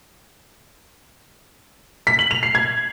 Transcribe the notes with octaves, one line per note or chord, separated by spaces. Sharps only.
B6
F#7
F7
C7
G#6